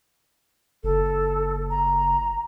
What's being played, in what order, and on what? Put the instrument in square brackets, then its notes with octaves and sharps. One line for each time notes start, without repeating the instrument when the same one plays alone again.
[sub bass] F#1 [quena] A4
[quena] A#5